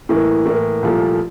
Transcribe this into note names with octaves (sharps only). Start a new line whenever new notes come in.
A2 E3 A#3
A2 E3 A#3
C2 A#2 F3 A3